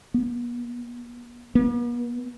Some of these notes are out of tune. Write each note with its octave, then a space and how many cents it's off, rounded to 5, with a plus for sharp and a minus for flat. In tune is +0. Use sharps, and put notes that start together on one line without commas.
B3 -45
B3 -45